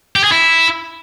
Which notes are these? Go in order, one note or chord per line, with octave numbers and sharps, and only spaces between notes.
G4
G#4
E4